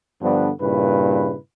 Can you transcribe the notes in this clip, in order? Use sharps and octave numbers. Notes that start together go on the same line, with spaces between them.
G2 D3 F3 B3 D4
G2 A#2 C#3 E4 B4